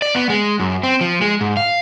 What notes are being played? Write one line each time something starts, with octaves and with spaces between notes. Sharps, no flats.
D5
B3
G#3
F#2
C4
F3
G#3
G#2
F5